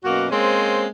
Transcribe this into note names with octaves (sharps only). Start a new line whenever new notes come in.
F#2 B2 A#3 F#4
G#3 A#3 C4 C#4 C5